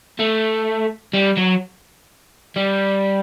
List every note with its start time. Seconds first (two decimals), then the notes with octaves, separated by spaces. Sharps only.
0.19 A3
1.14 G3
1.37 F#3
2.56 G3